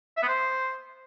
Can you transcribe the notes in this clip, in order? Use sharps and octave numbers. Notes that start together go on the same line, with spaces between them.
E5
B3
C5